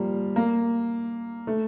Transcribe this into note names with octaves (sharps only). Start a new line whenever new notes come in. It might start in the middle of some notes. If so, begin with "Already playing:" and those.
Already playing: F3 G3 A#3
A#3
A3